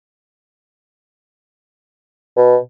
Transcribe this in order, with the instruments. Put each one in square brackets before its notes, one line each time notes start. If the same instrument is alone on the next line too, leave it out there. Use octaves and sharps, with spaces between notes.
[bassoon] B2